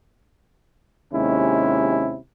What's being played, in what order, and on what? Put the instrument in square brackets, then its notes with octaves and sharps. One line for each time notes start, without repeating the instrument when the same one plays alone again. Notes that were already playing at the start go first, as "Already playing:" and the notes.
[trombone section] D#2 C3 G#3 C#4 E4